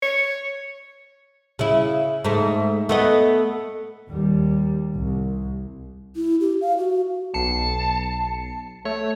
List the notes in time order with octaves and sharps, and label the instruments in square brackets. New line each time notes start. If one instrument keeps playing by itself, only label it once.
[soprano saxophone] C#5
[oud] C#3 E4
G#2 A3
A3 B3 D#5
[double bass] D#2 G3
C2
[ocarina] E4
G4
F5
F#4
[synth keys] B1 C7 C#7 [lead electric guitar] A5
[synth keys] A3 [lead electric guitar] C#5